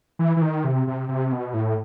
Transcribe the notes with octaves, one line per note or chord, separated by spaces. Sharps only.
E3
E3
D#3
C3
C3
C3
B2
A2